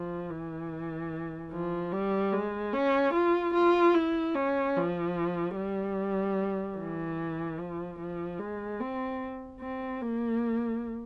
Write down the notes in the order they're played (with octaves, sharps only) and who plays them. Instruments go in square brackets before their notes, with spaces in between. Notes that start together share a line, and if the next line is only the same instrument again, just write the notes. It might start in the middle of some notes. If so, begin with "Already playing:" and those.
Already playing: [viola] F3
E3
F3
G3
G#3
C#4
F4
F4
E4
C#4
F3
G3
E3
F3
F3
G#3
C4
C4
A#3